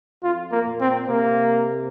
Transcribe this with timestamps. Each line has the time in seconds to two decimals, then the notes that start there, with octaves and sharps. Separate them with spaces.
0.23 F2 F4
0.52 A#3
0.65 A#2
0.81 C4
1.08 C3 A#3